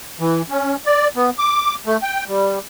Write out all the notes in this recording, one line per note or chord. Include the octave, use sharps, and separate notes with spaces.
E3
C#4
D5
B3
D6
A3
G5
G3